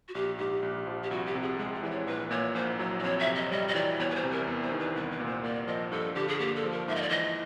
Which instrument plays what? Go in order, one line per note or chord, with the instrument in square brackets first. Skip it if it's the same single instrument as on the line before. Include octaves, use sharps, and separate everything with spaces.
[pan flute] F#4
[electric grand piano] A#1 [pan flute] G4
[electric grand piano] G#2 [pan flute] G4
[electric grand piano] A#1
F3
[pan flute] G4
[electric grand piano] C2 [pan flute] F#4
[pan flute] G4
[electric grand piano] C3
[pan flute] G#4
[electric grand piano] G#3 [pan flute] G#4
[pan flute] G#4
[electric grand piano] E3 [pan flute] D5
[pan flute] C#5
[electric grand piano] A#1 [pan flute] B4
[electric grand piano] A#2 [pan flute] C#5
[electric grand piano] A#1 [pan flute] C5
[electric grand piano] F#3 [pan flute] C#5
[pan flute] D5
[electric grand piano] F2 [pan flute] C#5
[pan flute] E5
[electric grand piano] C3
[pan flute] D#5
[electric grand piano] G3 [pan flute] D#5
[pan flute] D#5
[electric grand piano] E3 [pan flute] D5
[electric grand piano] E2 [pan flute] C#5
[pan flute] B4
C5
[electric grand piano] C3
[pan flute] A#4
[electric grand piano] E2
[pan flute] C5
[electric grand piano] D#3
[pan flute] B4
[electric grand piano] C2 [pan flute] B4
[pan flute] B4
[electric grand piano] A#2
[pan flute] C5
[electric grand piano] A#3 [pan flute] D5
[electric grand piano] F3 [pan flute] D#5
[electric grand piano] G2 [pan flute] A4
[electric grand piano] D3 [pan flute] G4
[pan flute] G#4
[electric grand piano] A#3 [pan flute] G4
[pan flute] A4
[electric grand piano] F3
[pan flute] A#4
[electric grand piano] G#2 [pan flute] E5
[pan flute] D#5
D5
[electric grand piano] E3 [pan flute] D#5